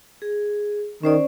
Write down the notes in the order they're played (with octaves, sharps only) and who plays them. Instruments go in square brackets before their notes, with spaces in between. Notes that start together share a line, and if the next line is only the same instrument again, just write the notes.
[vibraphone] G#4
[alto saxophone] D#3 [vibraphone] C#4 C5 D5